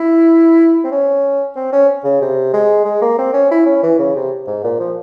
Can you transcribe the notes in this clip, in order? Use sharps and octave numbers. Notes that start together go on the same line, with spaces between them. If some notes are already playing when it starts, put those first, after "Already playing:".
Already playing: E4
C4
C#4
C4
C#4
C#3
C3
G#3
G#3
A#3
C4
C#4
E4
C#4
E3
C#3
C3
G#2
A#2
F3